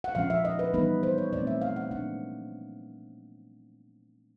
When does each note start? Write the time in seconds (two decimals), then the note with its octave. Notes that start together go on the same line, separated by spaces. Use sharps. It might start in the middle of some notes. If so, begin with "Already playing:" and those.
0.04 F#5
0.15 A#2 F3 G#3 C#4 F5
0.30 E5
0.45 D#5
0.59 B4
0.74 E3 G3 B3 D#4 B4
1.03 C5
1.18 C#5
1.32 A#2 F#3 A3 C4 D5
1.47 E5
1.62 F5
1.76 F#5
1.91 A#2 F3 A#3 D4 F#5